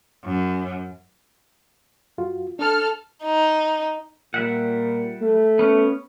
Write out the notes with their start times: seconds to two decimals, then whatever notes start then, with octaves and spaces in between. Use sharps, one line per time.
0.24 F#2
2.18 F#2 F4 F#4
2.59 D4 A4 F6
3.24 D#4
4.34 A#2 G3 E5 F#5
5.21 A3
5.59 B3 C#4